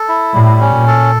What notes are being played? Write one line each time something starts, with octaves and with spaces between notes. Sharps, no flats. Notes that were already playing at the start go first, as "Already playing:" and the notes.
Already playing: A4
E4
A2 G3
C#4
A#2
A4